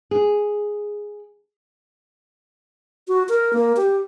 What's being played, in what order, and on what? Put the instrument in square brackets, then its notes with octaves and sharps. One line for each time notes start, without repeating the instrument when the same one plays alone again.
[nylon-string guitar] G#4
[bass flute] F#4
A#4
A#3
G4